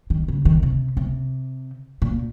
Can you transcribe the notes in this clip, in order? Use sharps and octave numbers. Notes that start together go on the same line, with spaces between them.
D#3
C#3
D#3
C3
C3
A#2